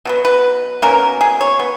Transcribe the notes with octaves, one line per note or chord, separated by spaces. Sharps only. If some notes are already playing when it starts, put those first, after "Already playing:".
B2 F#3 B3
B4
B2 A#3 C#4 A#4
G#4
C#5
B3